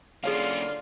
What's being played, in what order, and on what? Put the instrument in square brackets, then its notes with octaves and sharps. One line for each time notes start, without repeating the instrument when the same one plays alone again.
[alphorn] D3 [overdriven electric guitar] A#3 C#4 [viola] F4 [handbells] G#4 C#5 F5